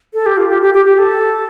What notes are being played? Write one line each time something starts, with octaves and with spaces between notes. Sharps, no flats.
A4
G4
F4
G4
G4
G4
G4
A4